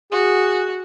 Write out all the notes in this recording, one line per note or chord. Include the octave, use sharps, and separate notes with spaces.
F#4 G#4